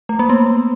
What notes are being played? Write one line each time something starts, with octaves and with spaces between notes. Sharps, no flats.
A3
A#3
B3